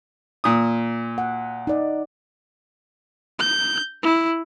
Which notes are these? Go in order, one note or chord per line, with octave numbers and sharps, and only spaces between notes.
A#2 D#6
F#5
D#4 D5
G6
E4